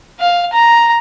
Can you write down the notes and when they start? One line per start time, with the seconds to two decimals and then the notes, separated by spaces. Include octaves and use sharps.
0.20 F5
0.52 A#5